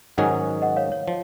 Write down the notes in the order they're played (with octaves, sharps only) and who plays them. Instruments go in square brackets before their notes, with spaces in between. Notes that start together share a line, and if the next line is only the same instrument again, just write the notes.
[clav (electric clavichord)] G#2 D#3 F#3 C#4 G#4 [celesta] D#5 F#5
[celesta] D#5 F#5
C#5 F5
C#5
[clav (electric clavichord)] F3